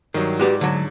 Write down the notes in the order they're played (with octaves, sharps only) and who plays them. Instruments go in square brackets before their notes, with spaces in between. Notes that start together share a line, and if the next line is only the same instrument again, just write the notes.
[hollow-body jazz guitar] G2 [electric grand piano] D#3 F#3
[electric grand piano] G#2 D5 [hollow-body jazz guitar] F#4 G4 B4
[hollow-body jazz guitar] D3 F#3